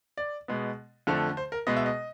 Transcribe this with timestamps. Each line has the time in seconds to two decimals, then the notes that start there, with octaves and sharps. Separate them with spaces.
0.17 D5
0.48 B2 G#3 B3
1.07 F2 D3 F3 A3
1.37 C5
1.52 A#4
1.67 B2 G#3 B3 D#5
1.77 E5
1.86 D#5